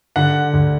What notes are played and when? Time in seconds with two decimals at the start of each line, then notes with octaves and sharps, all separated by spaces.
0.16 D3 F#5
0.53 D2